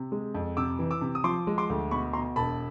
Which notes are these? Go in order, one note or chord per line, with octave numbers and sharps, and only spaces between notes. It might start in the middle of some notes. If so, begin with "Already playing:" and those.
Already playing: C3
G#3
F2
C3 D6 E6
E3
D6 E6
C3
D#6
F3 C6 D6
G#3
C6 D6
D2
B2 B5 C#6
B2 A#5 C6
E1 A5 B5